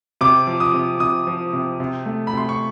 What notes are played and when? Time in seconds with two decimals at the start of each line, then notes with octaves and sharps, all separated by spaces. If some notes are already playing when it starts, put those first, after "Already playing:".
0.21 C3 D6
0.47 F3
0.60 D#6
0.74 C3
1.00 C3 D#6
1.27 F3
1.53 C3
1.80 C3
2.06 A3
2.27 B5
2.33 C3 C6
2.49 C#6